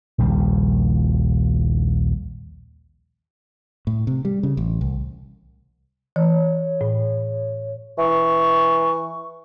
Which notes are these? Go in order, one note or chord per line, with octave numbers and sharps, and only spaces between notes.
A#1 D#2 C#3 G3
A2
C3
G3
C#3
A1
C2
E3 C#5
A2
E3 C#6